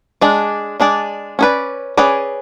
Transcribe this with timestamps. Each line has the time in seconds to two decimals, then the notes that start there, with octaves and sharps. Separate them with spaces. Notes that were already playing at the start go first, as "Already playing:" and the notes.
0.21 G#3 D4 G#4 D5
0.80 G#3 D4 G#4 D5
1.39 C#4 G#4 B4 D5
1.97 C#4 G#4 B4 D5